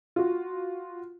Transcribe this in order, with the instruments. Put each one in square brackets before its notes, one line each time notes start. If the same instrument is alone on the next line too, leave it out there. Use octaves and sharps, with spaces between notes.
[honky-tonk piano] F4 F#4